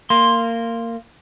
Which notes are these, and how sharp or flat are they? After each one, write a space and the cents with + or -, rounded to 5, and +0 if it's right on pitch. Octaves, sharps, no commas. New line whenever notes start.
A#3 -20 C6 +5